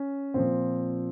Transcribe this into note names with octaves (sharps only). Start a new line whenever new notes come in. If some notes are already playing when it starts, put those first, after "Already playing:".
Already playing: C#4
A#2 F3 C4